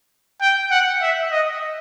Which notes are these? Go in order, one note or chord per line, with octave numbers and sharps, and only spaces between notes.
G5
F#5
E5
D#5